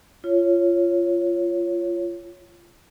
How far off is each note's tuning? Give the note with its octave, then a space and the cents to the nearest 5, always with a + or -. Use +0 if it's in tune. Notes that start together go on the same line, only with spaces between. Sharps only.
F4 -20 C#5 +0